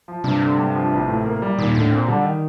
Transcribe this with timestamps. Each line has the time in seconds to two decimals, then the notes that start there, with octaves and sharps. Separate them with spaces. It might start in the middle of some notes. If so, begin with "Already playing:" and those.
0.08 F3
0.24 G2 C3
0.42 D3
0.58 G2
0.75 F3
0.92 A1
1.08 A2
1.26 A#3
1.42 G3
1.58 D#2 A#2
1.75 A2 D3
1.91 A#2 C4
2.08 D3 G3
2.25 D#3